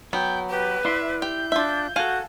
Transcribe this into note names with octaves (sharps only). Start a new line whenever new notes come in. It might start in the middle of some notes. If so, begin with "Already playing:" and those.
F#3 B3 G5
G4 B4
E4 D5 E5 C6
G4 G6
D4 F4 E5
F#4 A4 F5 F#5 G#5